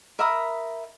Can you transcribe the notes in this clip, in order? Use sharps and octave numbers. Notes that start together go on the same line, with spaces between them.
A#4 E5 B5 D#6